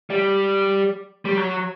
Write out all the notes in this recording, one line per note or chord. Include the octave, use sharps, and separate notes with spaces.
G3
G3
F#3